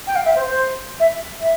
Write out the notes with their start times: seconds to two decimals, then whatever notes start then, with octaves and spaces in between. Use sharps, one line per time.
0.07 G5
0.16 F5
0.25 E5
0.36 C5
0.46 C5
1.00 E5
1.41 E5